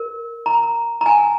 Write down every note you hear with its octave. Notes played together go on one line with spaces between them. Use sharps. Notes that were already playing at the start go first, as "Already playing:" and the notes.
Already playing: A#4
A#5
A#5
G#5